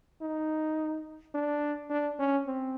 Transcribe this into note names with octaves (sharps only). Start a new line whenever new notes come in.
D#4
D4
D4
C#4
C4